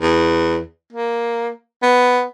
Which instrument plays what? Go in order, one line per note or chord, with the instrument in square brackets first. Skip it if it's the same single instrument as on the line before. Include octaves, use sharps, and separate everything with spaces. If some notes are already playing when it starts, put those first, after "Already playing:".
[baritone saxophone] E2
A#3
B3